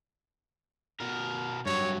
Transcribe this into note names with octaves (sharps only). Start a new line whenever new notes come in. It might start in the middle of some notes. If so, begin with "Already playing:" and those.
B2 A#4
G2 F#3 C#5